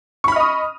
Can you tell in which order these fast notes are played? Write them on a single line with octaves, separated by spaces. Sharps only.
C#6 B5 F6 D#5 D#6